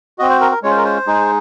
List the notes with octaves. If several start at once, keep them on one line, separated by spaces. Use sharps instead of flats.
C4 F#4 D#5
C5
A#4
A#4
G#3 C#4 F4 C#5
C5
A#4
C5
G#3 D#4 G#4